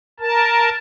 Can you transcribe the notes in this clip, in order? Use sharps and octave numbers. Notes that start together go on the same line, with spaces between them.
A#4 A5